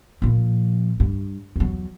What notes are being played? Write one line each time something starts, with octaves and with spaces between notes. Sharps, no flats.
A#2 F3
G2
E2 F#3